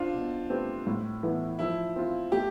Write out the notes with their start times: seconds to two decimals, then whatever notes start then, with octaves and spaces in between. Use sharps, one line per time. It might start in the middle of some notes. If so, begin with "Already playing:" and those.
Already playing: C4 D4 F4
0.14 B2
0.50 A3 C4 G4 B4
0.87 A2
1.23 E3 B3 E4 A4
1.59 F3 E4
1.96 C4 F4
2.32 A3 G4